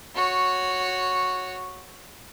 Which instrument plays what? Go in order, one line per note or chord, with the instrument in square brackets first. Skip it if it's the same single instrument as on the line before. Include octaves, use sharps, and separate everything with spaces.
[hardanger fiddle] F#4 C#5